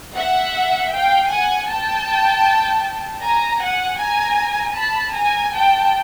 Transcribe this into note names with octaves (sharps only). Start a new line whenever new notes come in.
E5 F#5
F5 G5
F#5 G#5
G5 A5
G#5 A#5
F#5 G#5
G#5 A#5
A5 B5
G#5 A#5
G5 A5